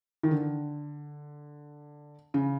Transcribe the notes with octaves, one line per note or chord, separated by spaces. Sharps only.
D#3
D3
C#3